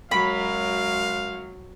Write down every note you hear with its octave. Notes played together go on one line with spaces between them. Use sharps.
F#2 F#3 G#3 F5 B5